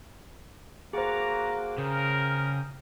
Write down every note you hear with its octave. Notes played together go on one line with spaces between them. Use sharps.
A#3 F#4 G#4 C5 A#5 D6
C#3 C#4 A#4 G5 D#6